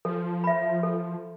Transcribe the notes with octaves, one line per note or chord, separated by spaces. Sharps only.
F3 A4
E5 B5
A4